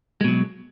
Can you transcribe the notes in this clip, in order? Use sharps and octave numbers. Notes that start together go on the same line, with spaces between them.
B2 F#3 G#3